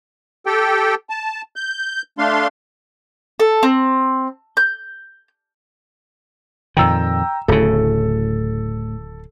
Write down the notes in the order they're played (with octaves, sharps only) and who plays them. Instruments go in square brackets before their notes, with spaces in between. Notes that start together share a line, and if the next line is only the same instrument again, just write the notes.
[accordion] G4 A4 G5
A5
G6
A3 D4 F5 C6
[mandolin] A4
C4
G6
[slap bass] F2 A#2 D#3 [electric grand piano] G5 A#5 E6
[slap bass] D1 C#3 [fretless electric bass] A2 [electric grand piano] A4